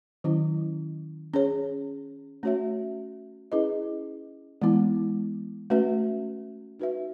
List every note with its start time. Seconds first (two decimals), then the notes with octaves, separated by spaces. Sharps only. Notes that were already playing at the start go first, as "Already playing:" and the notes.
0.24 D#3 F#3 C#4 E4
1.34 C#4 G#4 C#5
2.43 A3 C#4 F#4 C#5 E5
3.52 C#4 E4 G#4 B4 D#5
4.62 E3 G#3 B3 E4
5.70 A3 C#4 F#4 B4 E5
6.80 D#4 F#4 B4 E5